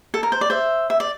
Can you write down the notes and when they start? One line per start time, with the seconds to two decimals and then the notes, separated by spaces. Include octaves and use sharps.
0.14 A4
0.23 A#4
0.32 C5
0.41 D5
0.50 C5 E5
0.90 E5
1.00 D5